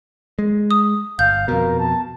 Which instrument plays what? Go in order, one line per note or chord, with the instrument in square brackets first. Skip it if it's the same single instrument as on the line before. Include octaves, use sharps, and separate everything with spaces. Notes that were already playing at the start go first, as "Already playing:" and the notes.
[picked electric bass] G#3
[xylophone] D#6
[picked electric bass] G1 [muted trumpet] F5 [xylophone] G6
[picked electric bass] F2 B2 [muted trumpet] A#4
[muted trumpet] A5